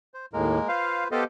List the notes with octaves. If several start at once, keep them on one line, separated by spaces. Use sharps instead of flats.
C5
D#2 A2 G#3 A#3 A#4
F4 B4 C5 F5
B3 G4 A4 C5 D#5 F5